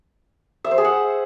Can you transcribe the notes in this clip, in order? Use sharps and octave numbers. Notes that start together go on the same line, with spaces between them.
E5
C5
G#4
F#5